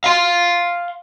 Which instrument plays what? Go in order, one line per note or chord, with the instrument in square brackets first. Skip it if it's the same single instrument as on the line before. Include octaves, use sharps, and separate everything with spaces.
[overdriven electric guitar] F5 C6